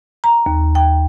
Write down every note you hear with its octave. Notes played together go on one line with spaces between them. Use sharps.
A#5
D#2
G5